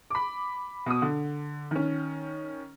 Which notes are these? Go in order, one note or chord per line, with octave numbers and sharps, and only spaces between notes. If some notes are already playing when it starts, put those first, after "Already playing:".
B5 D6
B2 D#6
D3
D#3 C#4